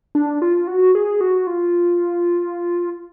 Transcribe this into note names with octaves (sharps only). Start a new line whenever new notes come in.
D4
F4
F#4
G#4
F#4
F4